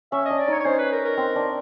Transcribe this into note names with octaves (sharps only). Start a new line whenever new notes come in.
C#4 E5
D#5
D4
D5
D#4 C#5
C#5
C#4 C5
B4
A#4
A#4
C4
D4